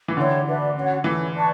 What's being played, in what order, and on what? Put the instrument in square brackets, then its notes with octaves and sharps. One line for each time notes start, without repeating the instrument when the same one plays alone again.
[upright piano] E3
[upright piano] D3 [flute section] E4 G4 C#5
[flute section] D4 F#4 B4 E5
C#4 F#4 C#5 F#5
[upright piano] E3 [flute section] C#4 E4 A4
[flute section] B4 D5 A5 C#6